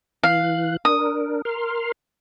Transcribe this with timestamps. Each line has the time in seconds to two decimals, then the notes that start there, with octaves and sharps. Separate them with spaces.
0.23 E3 F5 F#6
0.85 D4 A#4 D#6
1.45 A#4 C6 F6